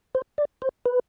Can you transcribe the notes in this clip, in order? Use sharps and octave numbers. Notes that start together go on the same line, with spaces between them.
C5
D5
C5
B4